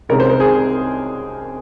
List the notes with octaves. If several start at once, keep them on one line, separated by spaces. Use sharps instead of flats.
C2 C3 D#3 G#3 C#4 A#4
C5
A#4
G#4